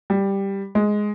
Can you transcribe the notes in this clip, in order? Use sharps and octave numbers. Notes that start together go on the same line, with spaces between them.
G3
G#3